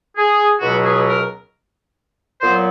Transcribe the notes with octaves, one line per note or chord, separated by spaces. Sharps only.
G#4
C#2 B2 F#3 B3 F#4
G#4
A#4
A#2 F#3 B3 C5